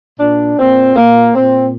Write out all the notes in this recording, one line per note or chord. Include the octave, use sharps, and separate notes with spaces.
A#2 D4
A#2 C4
A#2 A#3
A#2 C4